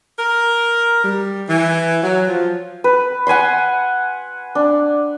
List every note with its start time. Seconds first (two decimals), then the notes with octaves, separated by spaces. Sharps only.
0.19 A#4
1.05 G3
1.49 E3
2.03 F#3
2.28 F3
2.84 B4
3.27 F#5 G#5 B5 C6
4.55 D4